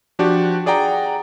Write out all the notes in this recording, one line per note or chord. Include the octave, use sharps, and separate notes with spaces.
F3 D4 F#4 G4
G#4 D5 F#5 G5 A#5